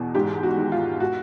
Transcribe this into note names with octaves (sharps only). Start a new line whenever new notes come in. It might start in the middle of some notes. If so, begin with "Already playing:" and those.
Already playing: E2 B2
G#2 G4
F#4
D#3
F4
F#4